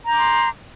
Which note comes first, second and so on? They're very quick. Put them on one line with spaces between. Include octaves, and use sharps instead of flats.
A#5 G6 D6 C6